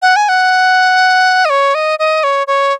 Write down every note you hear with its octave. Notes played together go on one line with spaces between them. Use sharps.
F#5
G#5
F#5
D#5
C#5
D#5
D#5
C#5
C#5